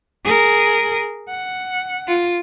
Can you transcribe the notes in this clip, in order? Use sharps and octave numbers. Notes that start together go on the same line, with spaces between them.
G#4 A#4
F#5
F4